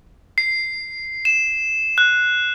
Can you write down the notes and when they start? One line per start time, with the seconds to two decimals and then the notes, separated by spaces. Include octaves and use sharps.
0.38 C7
1.25 E7
1.98 F#6